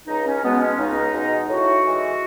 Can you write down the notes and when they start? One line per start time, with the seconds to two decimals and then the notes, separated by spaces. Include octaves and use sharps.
0.07 C#2 D#4
0.26 C#4
0.43 B2 G#3 B3
0.60 C#4
0.77 C#2 D#4
1.13 B2 G#3
1.48 A2 F#4
1.84 E3 G#3